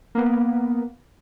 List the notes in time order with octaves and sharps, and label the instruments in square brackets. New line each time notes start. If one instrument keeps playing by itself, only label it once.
[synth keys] A#3 B3